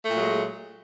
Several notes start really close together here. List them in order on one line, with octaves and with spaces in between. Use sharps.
A3 A#2 F#3 G#3